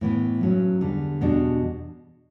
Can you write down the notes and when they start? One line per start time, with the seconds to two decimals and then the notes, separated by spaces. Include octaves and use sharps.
0.01 A2 E3 B3
0.41 G2 F#3 C#4
0.81 E2 D3 G3
1.21 E2 B2 G3 D4